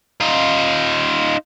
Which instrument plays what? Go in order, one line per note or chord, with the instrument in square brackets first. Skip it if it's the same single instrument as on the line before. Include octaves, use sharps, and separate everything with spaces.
[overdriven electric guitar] D#4 F4